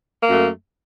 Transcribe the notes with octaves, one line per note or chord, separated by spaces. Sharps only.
F#2 A3 A#3